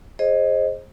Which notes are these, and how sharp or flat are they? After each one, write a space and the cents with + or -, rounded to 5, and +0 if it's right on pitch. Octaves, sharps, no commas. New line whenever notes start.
G#4 +0 C5 +25 D#5 -5